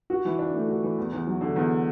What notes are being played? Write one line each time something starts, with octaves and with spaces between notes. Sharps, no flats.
F#4
E3
D4
A3
F#4
E3
E2
E2
F#3
D3
E2